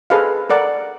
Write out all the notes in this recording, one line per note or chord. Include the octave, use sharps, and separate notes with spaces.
G#4 A4 B4 C5 D#5 F5
A4 A#4 D5 F#5